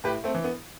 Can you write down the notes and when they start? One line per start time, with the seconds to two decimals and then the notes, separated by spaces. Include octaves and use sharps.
0.04 A2 G4 B4
0.24 A3 C4
0.34 E3
0.44 B3